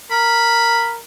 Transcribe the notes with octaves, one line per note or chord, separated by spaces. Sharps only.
A#4 B5